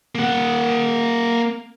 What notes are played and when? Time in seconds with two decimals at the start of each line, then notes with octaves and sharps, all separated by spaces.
0.15 A#3 F#5